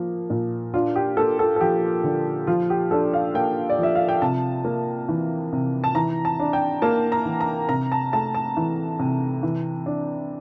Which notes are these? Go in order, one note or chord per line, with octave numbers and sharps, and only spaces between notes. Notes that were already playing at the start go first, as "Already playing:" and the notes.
Already playing: F3 A#3
A#2
D4 F4
G4
A#3 A4
A4
A4
F3 G4
D3
F3 F4
G4
D4 A4
F5
A#3 G5
D5
F3 E5
F5
G5
C3 A5
A#3
E3
C3
A5
E3 A#5
A5
D4
G5
A#3 A5
A#5
E3
A#5
C3 A#5
A5
A3 A5
A5
E3
C3
E3
D4